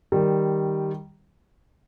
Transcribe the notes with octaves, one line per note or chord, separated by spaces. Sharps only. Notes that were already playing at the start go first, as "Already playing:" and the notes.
D#3 G3